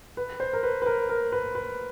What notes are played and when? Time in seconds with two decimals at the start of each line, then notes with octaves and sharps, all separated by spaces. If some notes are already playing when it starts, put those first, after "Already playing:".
0.17 B4
0.40 C5
0.53 A#4
0.63 B4
0.82 B4
0.86 A#4
1.09 A#4
1.32 B4
1.55 B4